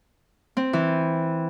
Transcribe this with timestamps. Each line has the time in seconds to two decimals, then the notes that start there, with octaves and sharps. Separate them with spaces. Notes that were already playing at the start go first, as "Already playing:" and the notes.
0.57 C4
0.73 E3